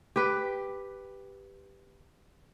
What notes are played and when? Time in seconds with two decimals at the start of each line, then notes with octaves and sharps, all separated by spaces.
0.16 G4 B4 G5